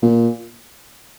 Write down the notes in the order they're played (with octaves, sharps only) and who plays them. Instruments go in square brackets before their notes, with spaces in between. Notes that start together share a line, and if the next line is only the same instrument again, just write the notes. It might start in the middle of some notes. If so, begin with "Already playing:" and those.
[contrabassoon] A#2